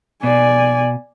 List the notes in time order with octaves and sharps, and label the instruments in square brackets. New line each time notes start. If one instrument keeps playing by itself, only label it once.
[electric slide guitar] B2 [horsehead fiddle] D5 G#5